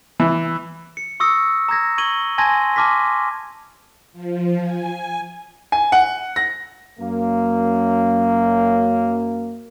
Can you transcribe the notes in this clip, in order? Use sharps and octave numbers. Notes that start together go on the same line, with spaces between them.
E3
C#7
C#6 D#6 E6 A#6 C#7
A#5 E6 G#6 A#6
C#6 G#6 D#7 F#7 G7
G#5 A5 C6 G#6 A#6 D#7
A5 C6 D6 F6 A#6 B6
F3
G#5
G#5
F#5
A#6
F#2 A#3